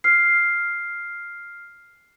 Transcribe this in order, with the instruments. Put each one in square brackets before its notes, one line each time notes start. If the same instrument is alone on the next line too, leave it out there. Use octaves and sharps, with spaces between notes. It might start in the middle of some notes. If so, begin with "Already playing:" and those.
[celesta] F6 C7